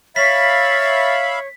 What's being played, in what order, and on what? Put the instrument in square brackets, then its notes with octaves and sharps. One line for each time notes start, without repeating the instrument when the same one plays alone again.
[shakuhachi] C#5 [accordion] E5 F5 B5 [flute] A6 [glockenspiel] B6